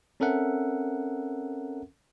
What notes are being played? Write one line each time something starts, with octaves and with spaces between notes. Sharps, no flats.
C4 C#4 A4 A#4 E5 F#5